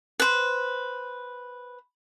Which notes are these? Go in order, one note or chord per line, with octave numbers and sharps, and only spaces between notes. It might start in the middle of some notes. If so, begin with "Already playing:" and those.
B4 C5